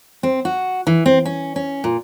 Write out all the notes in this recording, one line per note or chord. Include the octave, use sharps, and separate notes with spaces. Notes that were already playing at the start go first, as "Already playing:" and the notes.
C4
F#4
E3
C4
C#4
C#4
A#2